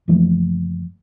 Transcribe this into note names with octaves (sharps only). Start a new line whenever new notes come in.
F#1 E3 F3 A3